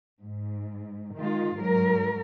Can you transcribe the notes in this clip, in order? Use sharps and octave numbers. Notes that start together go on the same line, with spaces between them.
G#2
D#3 G#3 F4
G#2 F#3 A#4